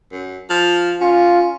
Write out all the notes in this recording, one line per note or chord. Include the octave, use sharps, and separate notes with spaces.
F#2
F3
C#4 F4